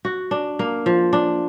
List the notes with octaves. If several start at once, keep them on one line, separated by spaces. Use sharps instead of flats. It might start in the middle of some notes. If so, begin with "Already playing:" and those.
F#4
D4
A#3
F3
D4